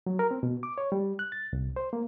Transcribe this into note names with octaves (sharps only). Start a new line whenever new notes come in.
F#3
A#4
C4
B2
D6
C#5
G3
F#6
A6
C2
C5
A#3